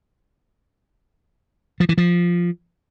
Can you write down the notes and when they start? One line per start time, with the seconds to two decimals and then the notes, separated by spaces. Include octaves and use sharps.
1.80 F3
1.89 E3
1.98 F3